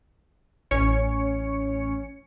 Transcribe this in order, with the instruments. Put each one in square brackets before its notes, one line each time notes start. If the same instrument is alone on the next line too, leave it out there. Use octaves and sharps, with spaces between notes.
[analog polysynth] A1 C#4 C#5 C#7